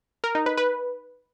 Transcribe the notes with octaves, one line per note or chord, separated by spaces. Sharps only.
A#4
D#4
B4
B4